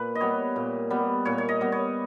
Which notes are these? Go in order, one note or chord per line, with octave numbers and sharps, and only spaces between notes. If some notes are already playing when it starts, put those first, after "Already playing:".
Already playing: A#2 B4
D#5
G3 B3 C#5
A#2
G3 B3
A#2 C#5
C#5
D#5
G3 B3
C#5